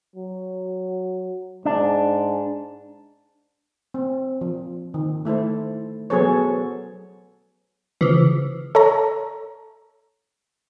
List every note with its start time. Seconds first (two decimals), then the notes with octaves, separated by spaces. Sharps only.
0.16 F#3
1.65 G#2 D4
3.94 C4
4.41 F3
4.94 D#3
5.25 A3 E4 A4 C5
6.10 F#3 B3 G#4 A4 C5 C#5
8.01 C#3 E3 F3
8.75 A4 C#5 A#5